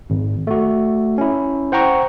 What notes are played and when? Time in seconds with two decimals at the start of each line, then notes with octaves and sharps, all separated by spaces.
0.10 G#1
0.47 A3 F#4
1.18 C#4 E4
1.72 C5 F#5 G5 A#5 C#6